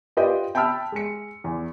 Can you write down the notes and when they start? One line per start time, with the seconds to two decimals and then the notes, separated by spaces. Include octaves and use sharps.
0.17 F4 G4 B4 D5 D#5 G5
0.55 G5 A5 B5 E6 F6
0.92 G#3 C#7
1.44 E2